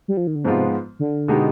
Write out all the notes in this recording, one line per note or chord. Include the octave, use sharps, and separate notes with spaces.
G3
F3
D#3
D3
G#2 C3 F3 G#3 B3 F4
D3
B2 G#3 B3 D#4 G4